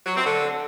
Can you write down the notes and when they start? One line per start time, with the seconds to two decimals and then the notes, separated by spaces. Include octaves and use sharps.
0.06 F#3
0.16 C4
0.26 D3